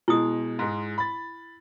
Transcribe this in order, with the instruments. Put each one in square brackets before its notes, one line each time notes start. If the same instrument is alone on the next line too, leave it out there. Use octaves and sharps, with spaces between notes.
[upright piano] B2 G#3 [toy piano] E4 D#6
[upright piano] G#2 G#3
B5 A6